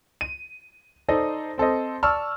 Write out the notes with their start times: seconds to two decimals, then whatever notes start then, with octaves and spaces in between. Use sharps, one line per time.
0.21 D#7
1.08 D#4 A4 C5 D5 D#5
1.58 C4 A4 C5 D#5
2.03 D5 A5 C#6 E6 F6